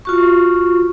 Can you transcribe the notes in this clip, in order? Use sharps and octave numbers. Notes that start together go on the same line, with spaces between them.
F4 F#4 C#6